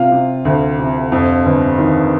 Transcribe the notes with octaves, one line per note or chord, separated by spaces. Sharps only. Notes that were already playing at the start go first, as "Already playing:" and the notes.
Already playing: C3 F4 F5
C3
D2
C3
F2
G1
D#3